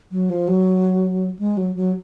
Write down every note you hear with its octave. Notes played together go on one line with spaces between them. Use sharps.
F#3
F3
F#3
G#3
F#3
F#3